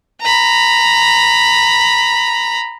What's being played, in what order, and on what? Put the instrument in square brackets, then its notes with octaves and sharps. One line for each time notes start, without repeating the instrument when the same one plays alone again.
[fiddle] A#5 B5